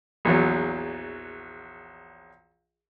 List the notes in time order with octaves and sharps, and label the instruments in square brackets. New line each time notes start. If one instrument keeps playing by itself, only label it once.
[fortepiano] A#1 E2 F#3